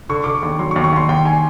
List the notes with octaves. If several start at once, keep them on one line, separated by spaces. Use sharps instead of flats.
D3 C#6
D3 D6
C#6
D#2
F#3 C6
C#6
D#2
C#6
D#2 C6
D#2 G5
G#5